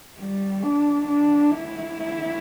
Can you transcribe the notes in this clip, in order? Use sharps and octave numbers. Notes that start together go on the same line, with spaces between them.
G3
D4
D4
E4